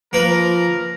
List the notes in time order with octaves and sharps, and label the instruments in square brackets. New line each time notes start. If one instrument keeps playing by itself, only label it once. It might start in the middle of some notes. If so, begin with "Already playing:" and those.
[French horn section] F3 [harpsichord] A#3 B4 [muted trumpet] A#4